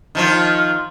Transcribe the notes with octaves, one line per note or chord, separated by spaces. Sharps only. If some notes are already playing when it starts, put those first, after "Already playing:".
D#3 F3 F4